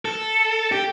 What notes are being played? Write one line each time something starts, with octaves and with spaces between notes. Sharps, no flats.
A4
G4